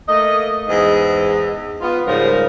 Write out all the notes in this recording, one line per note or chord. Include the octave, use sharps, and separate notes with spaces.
A3 A#3 D#5
E2 G#2 D#5
B3 F4
G#2 C#3 F3 G3 A#4